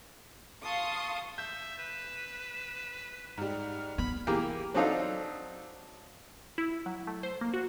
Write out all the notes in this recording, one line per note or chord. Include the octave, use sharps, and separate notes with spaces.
F5 A5 C6 C#6 D#6
E5 G6
B4 E7
G#2 G3 F6
B3 B5
E3 A#3 G4 G#4 A#4
F#3 C4 D4 D#4 A4 F5
E4
F#3
A3
C5
A#3
F#4